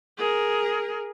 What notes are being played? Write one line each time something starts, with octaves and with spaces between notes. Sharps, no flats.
G#4 A#4